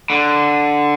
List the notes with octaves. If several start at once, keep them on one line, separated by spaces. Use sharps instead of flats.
D3